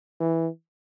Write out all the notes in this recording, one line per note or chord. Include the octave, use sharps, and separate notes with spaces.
E3